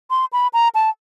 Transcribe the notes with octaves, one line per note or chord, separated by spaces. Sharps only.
C6
B5
A#5
A5